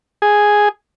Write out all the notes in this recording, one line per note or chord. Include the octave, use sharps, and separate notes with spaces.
G#4